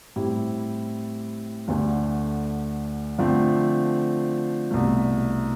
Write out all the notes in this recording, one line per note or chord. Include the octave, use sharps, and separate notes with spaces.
A2 G3 C4 E4 G4
D2 D3 A3
D3 F3 A3 C4
C2 B2 A3